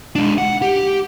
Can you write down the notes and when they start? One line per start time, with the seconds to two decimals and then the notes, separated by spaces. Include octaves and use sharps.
0.15 G#3 D4
0.38 F#5
0.62 G4